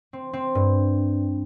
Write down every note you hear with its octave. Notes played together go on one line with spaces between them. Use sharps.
C4
C4
G2